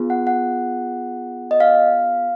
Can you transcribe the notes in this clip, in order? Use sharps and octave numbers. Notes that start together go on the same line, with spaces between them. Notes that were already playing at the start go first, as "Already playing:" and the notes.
Already playing: B3 F4 G#4
F#5
F#5
D#5
F5